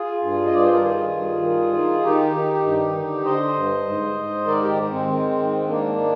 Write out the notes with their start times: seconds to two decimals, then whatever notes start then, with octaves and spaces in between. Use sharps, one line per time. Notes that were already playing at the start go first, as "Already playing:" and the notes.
Already playing: F4 G#4
0.22 G2
0.46 D#5
0.52 G2 D5
0.64 C5
0.73 A#4
0.82 D#3 F4 G#4
1.12 G2
1.42 D#3
1.73 D#3
2.03 D#3 D#4 G4
2.34 D#3
2.64 G2
2.95 D3
3.25 D3 C5 D#5
3.56 G2
3.86 G#2
4.16 G#2
4.47 D#3 A#4 D5
4.62 G4 A#4
4.77 D#3
4.92 G#3 C4
5.08 D#3
5.38 G#2
5.68 D#3 A#3 D4